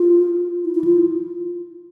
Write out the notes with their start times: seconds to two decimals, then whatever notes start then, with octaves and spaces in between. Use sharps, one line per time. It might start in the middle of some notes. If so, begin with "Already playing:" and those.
Already playing: F4
0.65 E4
0.75 E4
0.84 F4